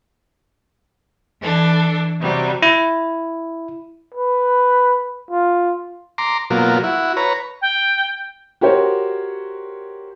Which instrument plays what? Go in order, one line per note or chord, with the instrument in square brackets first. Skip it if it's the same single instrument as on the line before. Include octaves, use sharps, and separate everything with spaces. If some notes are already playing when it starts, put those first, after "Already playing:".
[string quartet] E3 D4 A4
C3 F#3 G3
[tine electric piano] E4
[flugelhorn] B4
F4
[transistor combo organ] A#5 C6 D6
B2 F#3 A#3 F4
E4 F#4
B4 C#5 A#5
[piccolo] G5
[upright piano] F#4 G4 A#4 C5 C#5